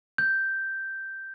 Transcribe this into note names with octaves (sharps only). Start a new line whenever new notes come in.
G6